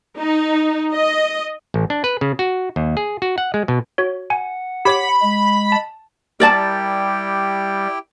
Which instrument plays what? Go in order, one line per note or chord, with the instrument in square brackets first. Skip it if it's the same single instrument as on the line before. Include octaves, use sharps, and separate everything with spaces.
[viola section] D#4
D#5
[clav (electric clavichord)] A1
D4
B4
C#3
F#4
D#2
G#4
F#4
F#5
G#3
B2
[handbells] F#4 C#5
[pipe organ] F#5 [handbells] G#5
[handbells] G4 C#5 D6 [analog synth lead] B5
[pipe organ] G#3
[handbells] A5
[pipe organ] G3 [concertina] E4 G4 G5 [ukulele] A#4 D5 A5